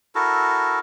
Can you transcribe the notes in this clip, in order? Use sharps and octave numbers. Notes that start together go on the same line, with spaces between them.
E4 F#4 A4 A#4